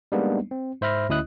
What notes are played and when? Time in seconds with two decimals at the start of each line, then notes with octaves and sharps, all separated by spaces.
0.12 G3 G#3 A#3 B3 D4 D#4
0.51 C4
0.81 G#2 C5 E5 B5 F6 A#6
1.09 D2 C#4 E4 D#5 D#6 F#6